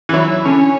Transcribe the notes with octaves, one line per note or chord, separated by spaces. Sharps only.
E3
F#3 E4
D3 C#4